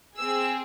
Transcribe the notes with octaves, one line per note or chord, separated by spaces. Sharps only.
C4 G#4 E6